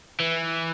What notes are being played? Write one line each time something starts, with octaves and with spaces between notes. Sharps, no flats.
E3